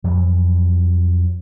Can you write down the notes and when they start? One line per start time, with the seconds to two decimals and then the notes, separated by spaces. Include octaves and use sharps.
0.04 F2 E3 F#3